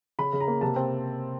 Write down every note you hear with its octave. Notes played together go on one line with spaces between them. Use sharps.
C#3 B5
C#3
A#5
A#3
C3 A5
C4